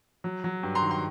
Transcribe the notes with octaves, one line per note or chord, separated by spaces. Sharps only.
F#3
F#3
G2
A#5 C6
D#3
C6